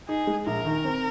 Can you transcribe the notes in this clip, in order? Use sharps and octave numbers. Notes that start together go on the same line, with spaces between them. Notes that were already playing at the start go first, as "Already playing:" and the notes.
D#4 G#4
G#3
A#1 A#4
D#3
C4